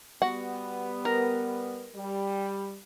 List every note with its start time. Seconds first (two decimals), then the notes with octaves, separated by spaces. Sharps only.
0.22 G3 B3 F#4 F#5
1.05 A#4
1.94 G3